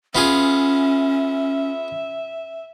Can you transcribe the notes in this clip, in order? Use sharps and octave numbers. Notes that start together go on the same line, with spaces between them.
B3 C#4 F4 G#4 E5